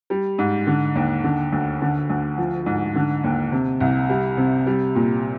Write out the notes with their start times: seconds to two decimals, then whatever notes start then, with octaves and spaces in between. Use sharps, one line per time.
0.10 G3
0.38 G#2
0.67 D3
0.95 D#2
1.24 D3
1.52 D2
1.82 D3
2.09 D2
2.38 F3
2.66 G#2
2.95 D3
3.24 D#2
3.52 C3
3.80 C2
4.09 G3
4.37 C3
4.66 G3
4.95 A#2